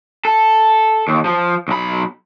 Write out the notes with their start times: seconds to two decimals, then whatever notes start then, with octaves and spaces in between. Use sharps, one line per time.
0.25 A4
1.08 D#2
1.25 F3
1.68 B1 B5